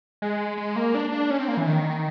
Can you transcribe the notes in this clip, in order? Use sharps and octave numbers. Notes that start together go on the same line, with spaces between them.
G#3
G#3
A#3
D4
D4
C#4
C4
A#3
E3
D#3